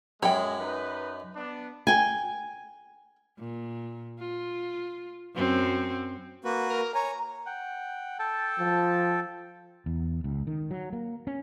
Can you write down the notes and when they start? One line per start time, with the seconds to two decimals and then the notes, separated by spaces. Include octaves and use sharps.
0.23 F#2 G#3 C#5 G5 B5
0.60 D#4 B4
1.36 B3 D4
1.87 G5 G#5
3.38 A#2
4.19 F4
5.35 F#2 C4 F#4
6.44 A#3 F#4 B4
6.69 A#4
6.95 C#5 G#5 A#5
7.46 F#5 G5
8.19 A4 G5 A5
8.60 F3
9.86 E2
10.24 C#2
10.47 D#3
10.71 F#3
10.93 A#3
11.27 C#4